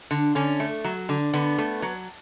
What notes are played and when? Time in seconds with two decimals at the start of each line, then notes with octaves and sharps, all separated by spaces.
0.11 D3
0.35 D3 C#4
0.60 A3
0.84 F#3
1.09 D3
1.33 D3 B3
1.58 A3
1.82 F#3